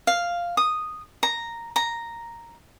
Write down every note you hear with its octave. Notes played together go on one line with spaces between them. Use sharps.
F5
D#6
A#5
A#5